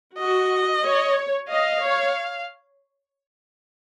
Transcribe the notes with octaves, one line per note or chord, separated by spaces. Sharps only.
F#4 D#5
C#5
D#5 F5
C#5